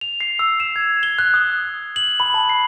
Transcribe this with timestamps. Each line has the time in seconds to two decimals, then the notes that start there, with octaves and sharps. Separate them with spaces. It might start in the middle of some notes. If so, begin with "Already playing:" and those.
0.01 F7
0.21 C7
0.39 E6
0.60 E7
0.76 G#6
1.03 G7
1.19 F#6
1.34 D#6
1.96 F#7
2.20 B5
2.34 A5
2.49 C7